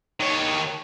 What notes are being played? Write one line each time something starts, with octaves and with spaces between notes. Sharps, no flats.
D#3 C#5